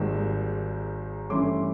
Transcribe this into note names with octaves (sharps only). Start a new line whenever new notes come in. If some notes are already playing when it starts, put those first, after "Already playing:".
Already playing: G#1 G#2 D#3 G3 A#3
G2 E3 A3 C#4 C6 D6